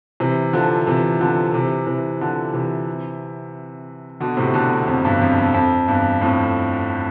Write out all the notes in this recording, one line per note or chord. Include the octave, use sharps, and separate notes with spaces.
C3 E3
D3 F3
C3 E3
D3 F3
C3 E3
C3 E3
D3 F3
C3 E3
B2 D3
A2 C3
B2 D3
E2
F2
E2 G2
F2
F2
F2
E2 G2
F2 A2